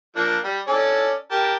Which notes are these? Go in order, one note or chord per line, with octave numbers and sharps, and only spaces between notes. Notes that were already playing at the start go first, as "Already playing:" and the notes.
F3 A#3 D4
G3
C#4 A4 D5
G4 A#4 A5